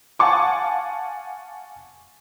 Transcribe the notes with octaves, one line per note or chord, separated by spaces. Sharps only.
F5 F#5 G#5 A5 C#6 D6